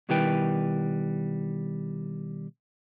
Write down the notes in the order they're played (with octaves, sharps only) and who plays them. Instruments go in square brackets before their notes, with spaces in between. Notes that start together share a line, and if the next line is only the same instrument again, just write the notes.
[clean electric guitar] B2 D#3 G3 E4 B4 G5